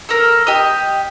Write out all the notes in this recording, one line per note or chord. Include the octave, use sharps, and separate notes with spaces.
A4 A#4
G4 D#5